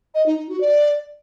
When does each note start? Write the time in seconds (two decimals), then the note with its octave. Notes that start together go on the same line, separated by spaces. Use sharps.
0.15 D#5
0.26 D#4
0.38 D#4
0.49 F#4
0.61 D5